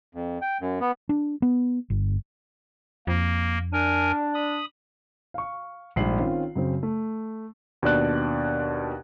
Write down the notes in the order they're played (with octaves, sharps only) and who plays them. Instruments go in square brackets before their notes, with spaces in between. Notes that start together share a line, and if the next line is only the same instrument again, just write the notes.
[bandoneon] F2
G5
F#2
B3
[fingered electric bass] D4
B3
G1
[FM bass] F2 [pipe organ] A#3
[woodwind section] D4 [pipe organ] A#4 G#5
[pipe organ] B5 D#6
[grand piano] F5 C#6
A#1 G#2 G3 F5 C7 F#7
D#3 C4 C#4 F4
F#2 C#3 C4
A3
[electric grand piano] D#2 B2 D4 D5 F#6